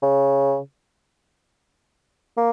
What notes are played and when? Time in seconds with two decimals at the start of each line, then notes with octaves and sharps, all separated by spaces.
0.03 C#3
2.37 A#3